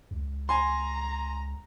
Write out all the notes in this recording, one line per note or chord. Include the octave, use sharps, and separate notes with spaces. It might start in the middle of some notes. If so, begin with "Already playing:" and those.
C#2
G#5 A#5 C6